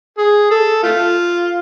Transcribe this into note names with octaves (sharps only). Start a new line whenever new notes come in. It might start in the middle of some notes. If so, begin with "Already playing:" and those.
G#4
A4
A3 F4